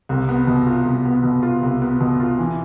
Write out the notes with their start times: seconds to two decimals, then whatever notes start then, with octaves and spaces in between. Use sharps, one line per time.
0.09 C2
0.29 B3
0.47 B2
0.67 F4
0.85 C2
1.05 B3
1.23 B2
1.43 F4
1.63 C2
1.82 B3
2.00 B2
2.20 F4
2.39 E3